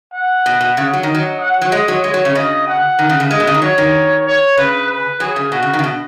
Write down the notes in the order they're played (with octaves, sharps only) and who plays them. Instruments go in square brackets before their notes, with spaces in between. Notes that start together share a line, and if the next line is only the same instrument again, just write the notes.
[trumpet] F#5
[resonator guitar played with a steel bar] B2
B2
C#3
F#3
D#3
[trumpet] D#5
[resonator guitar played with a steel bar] F#3
[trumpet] F#5
[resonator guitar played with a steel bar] F#3
[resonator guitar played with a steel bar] G#3 [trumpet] D#5
[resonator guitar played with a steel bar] F#3
[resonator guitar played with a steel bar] G#3 [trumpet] C#5
[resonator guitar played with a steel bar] F#3
C#3
[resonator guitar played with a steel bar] C#3 [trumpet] D#5
[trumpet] F#5
[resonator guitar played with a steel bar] D#3
C#3
C#3
[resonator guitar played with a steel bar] G#3 [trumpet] D#5
[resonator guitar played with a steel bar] B2
C#3
D#3
[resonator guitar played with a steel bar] F#3 [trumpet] C#5
[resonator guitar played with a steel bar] D#3
[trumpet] C#5
[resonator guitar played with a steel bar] C#3 [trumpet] B4
[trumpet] B4
[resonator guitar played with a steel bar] F#3 [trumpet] G#4
[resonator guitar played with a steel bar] C#3
[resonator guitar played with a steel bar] B2 [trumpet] F#4
[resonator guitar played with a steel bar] C#3
D#3
C#3
B2